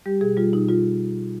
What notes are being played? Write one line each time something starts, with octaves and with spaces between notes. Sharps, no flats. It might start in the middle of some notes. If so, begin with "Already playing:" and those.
G3 G4
B2 G#4
G3 F4
B2 D#4
G3 F4